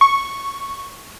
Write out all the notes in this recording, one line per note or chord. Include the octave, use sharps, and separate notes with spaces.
C#6